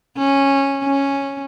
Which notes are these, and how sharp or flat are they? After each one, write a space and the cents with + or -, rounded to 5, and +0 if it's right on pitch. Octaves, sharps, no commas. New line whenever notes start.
C#4 -10
C#4 -5